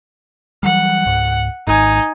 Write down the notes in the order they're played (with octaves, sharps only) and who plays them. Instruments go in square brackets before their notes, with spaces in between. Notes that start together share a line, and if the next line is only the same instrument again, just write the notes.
[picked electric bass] E3 F#3 G3 [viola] F#5
[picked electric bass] C#2 G#2
[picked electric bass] G#1 G#2 [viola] D#4 G#5